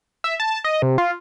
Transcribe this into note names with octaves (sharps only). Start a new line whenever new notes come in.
E5
A5
D#5
C3
F4